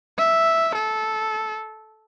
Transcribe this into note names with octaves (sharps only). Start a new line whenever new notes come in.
E5
A4